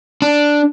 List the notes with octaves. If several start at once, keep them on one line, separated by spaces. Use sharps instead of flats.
D4